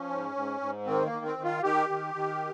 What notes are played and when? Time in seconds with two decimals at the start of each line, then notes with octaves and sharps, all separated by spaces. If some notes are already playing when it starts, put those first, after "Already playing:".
Already playing: F3 C#4
0.10 G#2
0.36 G#2
0.61 G#2
0.86 D#3 C4
1.06 A#3
1.12 D#3
1.26 C4
1.38 D#3
1.44 F4
1.63 D#3 G4
1.89 D#3
2.15 D#3